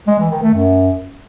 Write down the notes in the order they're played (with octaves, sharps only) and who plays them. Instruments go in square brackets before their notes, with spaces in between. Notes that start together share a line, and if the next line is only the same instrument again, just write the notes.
[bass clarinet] G#3
E3
D#3
A3
F#2